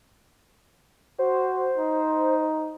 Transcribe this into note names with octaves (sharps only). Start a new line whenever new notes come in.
F#4 C5
D#4